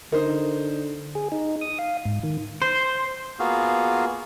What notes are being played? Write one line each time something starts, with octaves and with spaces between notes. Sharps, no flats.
D3 D#4 A#4 C5
G#4
D#4
D#6
F5
G#2
D#3
C5
A#3 B3 F4 F#4 G#4 F5